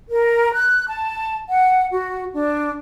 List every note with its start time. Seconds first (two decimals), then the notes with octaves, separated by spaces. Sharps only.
0.10 A#4
0.53 F#6
0.87 A5
1.48 F#5
1.90 F#4
2.34 D4